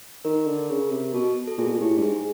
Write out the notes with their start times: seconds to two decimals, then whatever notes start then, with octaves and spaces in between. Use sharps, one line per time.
0.25 D#3 A#4
0.47 D3
0.70 C#3
0.91 C3
1.14 B2
1.47 A4
1.58 A#2 G#4
1.66 B2
1.72 A#2
1.81 A2 G4
1.97 G2
2.03 G#2 G#4